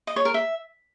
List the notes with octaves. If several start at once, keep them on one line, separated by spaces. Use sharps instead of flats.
D#5
C#5
A#4
E5